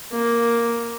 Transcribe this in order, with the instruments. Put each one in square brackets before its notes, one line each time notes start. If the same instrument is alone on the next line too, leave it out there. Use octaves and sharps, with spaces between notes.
[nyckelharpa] A#3